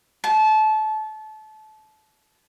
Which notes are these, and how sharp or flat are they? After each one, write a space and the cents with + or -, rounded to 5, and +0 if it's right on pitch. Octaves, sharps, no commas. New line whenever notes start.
A5 -25